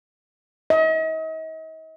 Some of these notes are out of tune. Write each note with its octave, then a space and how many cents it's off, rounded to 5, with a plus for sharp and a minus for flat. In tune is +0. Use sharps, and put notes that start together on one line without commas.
D#5 +40